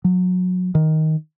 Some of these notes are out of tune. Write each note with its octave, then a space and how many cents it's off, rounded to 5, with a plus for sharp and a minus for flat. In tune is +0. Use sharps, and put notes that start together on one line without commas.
F#3 -25
D#3 +10